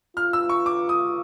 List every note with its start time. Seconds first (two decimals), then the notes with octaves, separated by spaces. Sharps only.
0.16 F4 F6
0.33 E6
0.49 C#6
0.66 D6
0.89 D#6